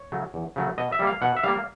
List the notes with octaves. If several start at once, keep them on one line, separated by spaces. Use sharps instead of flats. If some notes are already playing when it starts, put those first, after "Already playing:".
Already playing: C#5
C#3 F#3 A3
E2
C#3 F#3 A3
B2 D#5
E5
G3 A#3
F5
B2 F#5
E5
G3 A#3 F5